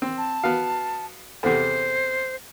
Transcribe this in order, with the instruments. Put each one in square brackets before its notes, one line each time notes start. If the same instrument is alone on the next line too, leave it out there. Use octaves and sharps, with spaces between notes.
[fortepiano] C4
[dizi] A5
[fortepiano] B3 F5 [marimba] F#4
[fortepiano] E2 C3 [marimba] A4 F#5 [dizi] C5